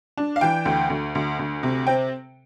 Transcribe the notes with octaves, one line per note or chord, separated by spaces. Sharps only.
D4
F5
E3 G5
D2
D2
D2
D2
C3
C4 G5